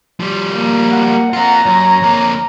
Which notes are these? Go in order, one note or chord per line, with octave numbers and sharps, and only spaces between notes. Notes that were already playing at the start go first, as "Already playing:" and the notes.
F3 G3
A#3
F#5
C4 F4 A#5
F#2 C#5
F2 A#3